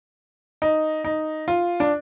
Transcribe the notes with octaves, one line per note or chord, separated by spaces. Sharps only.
D#4
D#4
F4
D4